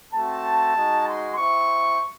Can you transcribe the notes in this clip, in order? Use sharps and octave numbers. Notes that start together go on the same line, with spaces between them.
A3 C4 F#4 A5
G#3 D#4 F#4
C6
C4 E4 C#6